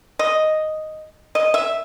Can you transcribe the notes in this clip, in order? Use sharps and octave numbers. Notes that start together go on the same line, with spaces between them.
D#5
D#5
E5